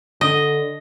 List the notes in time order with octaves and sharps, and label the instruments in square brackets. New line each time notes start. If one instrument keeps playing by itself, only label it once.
[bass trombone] D3 [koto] D#5